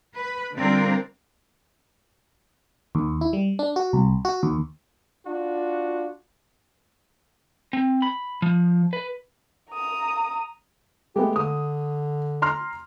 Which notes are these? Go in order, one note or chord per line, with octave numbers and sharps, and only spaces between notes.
B4
D3 G3 C4 D4 F4 A#4
D#2
E4
G3
D4
F#4
C2
F#4
D#2
D4 F4 F#4
C4
B5
F3
B4
A#5 D#6
G#3 A3 B3 G4
D3 D#6
A#5 C6 F6